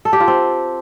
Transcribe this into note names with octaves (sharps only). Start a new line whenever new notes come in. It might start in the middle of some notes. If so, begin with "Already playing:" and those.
A4
G4
F4
C4